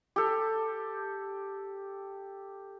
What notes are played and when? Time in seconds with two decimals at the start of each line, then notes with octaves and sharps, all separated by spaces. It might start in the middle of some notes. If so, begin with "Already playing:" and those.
0.16 G4 A4